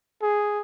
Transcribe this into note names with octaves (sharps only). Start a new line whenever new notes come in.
G#4